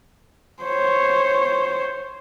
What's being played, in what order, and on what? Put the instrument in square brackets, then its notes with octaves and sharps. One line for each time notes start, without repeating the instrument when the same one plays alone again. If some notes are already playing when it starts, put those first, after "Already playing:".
[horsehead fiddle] C5 C#5